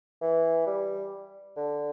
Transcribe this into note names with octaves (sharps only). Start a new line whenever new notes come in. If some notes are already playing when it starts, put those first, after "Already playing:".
E3
G3
D3